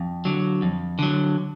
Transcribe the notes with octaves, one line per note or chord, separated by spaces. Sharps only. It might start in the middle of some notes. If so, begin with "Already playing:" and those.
Already playing: F2
D3 F#3
F2
D3 F#3